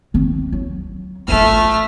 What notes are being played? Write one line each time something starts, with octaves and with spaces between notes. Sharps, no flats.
D#3 C4
F#3
A1 A3 F4 F6